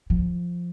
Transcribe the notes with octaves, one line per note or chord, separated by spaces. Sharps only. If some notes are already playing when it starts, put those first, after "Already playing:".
F3